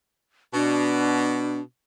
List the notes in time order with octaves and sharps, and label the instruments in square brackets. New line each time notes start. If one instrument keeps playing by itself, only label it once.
[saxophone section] B2 [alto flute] D4